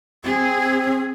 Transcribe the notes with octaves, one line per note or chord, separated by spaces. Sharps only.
C4 G#4